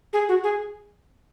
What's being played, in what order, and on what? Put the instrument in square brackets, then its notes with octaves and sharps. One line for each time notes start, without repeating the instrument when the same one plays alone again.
[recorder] G#4
F#4
G#4